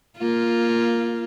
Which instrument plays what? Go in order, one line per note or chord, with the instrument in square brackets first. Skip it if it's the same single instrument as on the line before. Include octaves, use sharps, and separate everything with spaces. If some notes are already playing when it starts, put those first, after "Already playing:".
[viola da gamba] A#3 F4